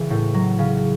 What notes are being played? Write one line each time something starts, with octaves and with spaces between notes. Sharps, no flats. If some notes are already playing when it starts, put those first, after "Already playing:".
Already playing: C#3 E3
A2
F#3
C#3